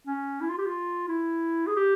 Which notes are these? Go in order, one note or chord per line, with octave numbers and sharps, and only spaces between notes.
C#4
E4
F4
G4
F4
E4
G#4
G4